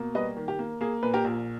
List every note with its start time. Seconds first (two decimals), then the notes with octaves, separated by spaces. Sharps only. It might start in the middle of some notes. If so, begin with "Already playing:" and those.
Already playing: B2 A#3
0.15 G3 B4 D#5
0.37 D#3
0.48 G4
0.59 A#3
0.81 A#3 G#4
1.03 A#2 B4
1.14 G4 A#4
1.24 A#1